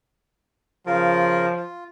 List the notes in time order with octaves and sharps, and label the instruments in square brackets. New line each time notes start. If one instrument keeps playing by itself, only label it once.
[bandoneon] C#3 F4 A#4 [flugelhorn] F3
[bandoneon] F4